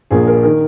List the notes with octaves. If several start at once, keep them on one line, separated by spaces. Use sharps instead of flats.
A#1 A#2 A#3 G#4
A#4
D#3 A#4